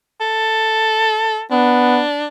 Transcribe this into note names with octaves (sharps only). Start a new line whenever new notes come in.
A4
B3 D4